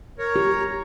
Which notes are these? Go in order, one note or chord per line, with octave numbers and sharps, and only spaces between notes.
A#4 C#5
G4